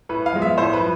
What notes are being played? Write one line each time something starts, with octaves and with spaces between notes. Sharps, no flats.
A2 B4
F5
F3 G#3 B3
E5
A2 C5
B4
F3